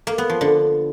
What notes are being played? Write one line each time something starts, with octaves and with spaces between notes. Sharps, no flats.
A#3
B3
F3
D3